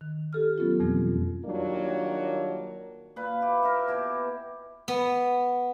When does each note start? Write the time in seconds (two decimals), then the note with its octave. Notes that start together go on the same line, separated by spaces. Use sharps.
0.01 D#3
0.33 G4 A4 F6
0.58 F#3 B3 C#4 F4
0.80 F2 B2 E3 G3 A#3 C4
1.45 D#3 F#3 G3 A#3 D4 F4
3.16 A#2 B4
3.41 E4 G4
3.63 A#4 E5
3.87 B2 E4 G4
4.88 B3